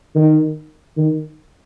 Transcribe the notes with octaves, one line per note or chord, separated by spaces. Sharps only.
D#3
D#3